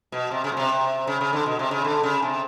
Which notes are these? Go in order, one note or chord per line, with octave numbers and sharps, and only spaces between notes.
B2
C3
C#3
B2
C3
C#3
C#3
D3
B2
C3
C#3
D3
C#3
C3